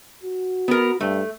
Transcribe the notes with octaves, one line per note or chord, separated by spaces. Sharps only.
F#4
B3 A#4
G2 A3